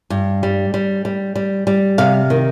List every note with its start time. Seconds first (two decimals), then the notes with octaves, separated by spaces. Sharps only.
0.10 G2
0.43 G3
0.74 G3
1.05 G3
1.35 G3
1.67 G3
1.98 C3 F5
2.30 D#3